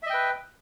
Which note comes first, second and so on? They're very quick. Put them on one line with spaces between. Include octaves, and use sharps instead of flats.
E5 D#5 G5 B4